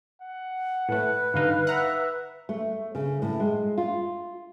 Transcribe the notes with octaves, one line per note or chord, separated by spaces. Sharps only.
F#5
A2 A3 B4
G2 D3 D#4 F5
E5 F#5 A#5
A3
C#3
A2
G#3
F4